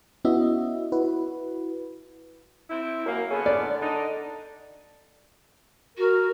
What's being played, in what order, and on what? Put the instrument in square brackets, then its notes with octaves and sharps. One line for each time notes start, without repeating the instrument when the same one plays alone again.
[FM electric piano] B3 C#4 E4 F#4 D#5 E5
E4 F#4 B4
[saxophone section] C4 E4
[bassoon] F#2 [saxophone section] A#3
[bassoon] C#3 [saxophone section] B3 C#4 A4
[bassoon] D3 [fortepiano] D5
[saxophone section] D4 D#4
[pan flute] F#4 [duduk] A#4